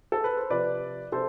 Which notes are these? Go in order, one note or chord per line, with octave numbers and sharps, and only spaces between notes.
A4
B4
C5
C3 F3 B4 D5
C3 A4 C5